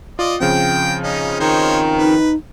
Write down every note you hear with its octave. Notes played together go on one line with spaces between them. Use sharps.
F4 D5 D#5
C#3 F3 C4 G5
C#4 D#4
D#3 D#4 C5 C#5
D#4 B4